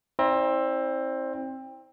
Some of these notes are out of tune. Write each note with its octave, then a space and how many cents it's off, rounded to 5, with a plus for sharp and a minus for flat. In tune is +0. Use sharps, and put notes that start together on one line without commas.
C4 +20 E4 -40 D5 +0